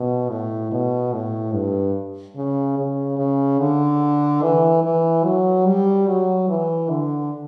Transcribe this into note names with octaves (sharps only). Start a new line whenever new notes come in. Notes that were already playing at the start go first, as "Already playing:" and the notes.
Already playing: B2
A2
B2
A2
G2
C#3
C#3
C#3
D3
E3
E3
F#3
G3
F#3
E3
D3